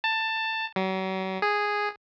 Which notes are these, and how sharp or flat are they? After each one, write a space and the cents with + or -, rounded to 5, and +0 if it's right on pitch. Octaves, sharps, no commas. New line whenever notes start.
A5 +15
F#3 +40
G#4 -5